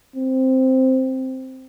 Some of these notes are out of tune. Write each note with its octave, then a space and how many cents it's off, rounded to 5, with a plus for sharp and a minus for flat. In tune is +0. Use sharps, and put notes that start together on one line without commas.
C4 +0